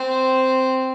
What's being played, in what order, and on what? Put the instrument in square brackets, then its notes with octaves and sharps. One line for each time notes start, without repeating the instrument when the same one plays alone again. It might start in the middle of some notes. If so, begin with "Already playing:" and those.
Already playing: [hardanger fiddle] C4